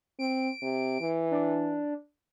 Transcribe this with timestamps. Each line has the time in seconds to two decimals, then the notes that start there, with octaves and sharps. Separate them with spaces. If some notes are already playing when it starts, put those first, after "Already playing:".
0.19 C4 D7
0.62 C3
1.01 E3
1.31 D4